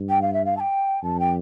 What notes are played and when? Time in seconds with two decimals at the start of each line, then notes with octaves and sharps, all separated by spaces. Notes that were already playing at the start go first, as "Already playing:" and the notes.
Already playing: G2
0.10 G5
0.22 F5
0.33 E5
0.45 F5
0.57 A5
0.60 G5
1.03 F2 A5
1.20 G5